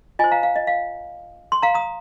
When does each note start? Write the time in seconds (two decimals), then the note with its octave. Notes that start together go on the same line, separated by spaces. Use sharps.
0.19 F4 D#5 G#5
0.24 C5
0.31 F5 A#5
0.43 F5
0.56 D#5
0.67 F5
1.52 C6
1.63 F5 A#5
1.74 A#5 D#6